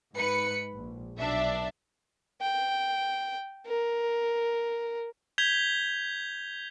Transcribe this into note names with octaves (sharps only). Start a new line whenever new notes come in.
G#2 B4 C#7
A#1
B1 D4 E5
G5
A#4
G6 G#6 B6 F7 G7